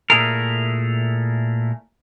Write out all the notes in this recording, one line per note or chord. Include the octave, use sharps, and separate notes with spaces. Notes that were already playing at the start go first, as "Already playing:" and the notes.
A#2 A3 E4 G#4 A#4